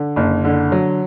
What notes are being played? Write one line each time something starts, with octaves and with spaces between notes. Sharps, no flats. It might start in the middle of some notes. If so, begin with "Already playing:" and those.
Already playing: D3
F#1
D3
F#3